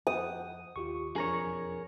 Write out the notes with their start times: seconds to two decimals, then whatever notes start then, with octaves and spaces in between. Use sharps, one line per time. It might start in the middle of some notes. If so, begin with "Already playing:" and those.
0.07 F2 F#5 G5 D#6
0.76 D#2 F4 G4 C#6
1.16 E1 F2 F3 C4 D4 G#4 A#4 C#5